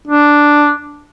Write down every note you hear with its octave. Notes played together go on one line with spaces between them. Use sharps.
D4